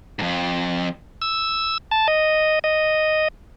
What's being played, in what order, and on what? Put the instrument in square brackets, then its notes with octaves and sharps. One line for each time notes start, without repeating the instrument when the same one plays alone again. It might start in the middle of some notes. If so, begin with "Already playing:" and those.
[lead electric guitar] F2 G#2
[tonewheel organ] E6
A5
D#5
D#5